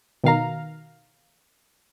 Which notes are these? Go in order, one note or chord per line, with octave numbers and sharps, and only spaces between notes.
B2 D#3 F5 A#5